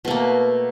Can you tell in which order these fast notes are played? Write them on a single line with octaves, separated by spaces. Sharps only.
B2 A3 A#3